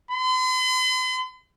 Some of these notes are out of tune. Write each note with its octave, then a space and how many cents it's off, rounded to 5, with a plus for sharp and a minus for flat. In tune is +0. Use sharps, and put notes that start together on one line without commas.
C6 -45